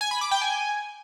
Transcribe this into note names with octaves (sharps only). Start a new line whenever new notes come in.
G#5
B5
D6
G5
G#5